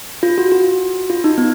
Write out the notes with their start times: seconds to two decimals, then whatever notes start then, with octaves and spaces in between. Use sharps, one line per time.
0.23 F4
0.38 F#4
0.52 F#4
1.10 F4
1.24 D#4
1.38 B3